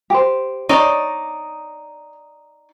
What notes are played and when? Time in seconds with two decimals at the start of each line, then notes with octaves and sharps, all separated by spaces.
0.10 G4 C5
0.69 D#4 C#5 D5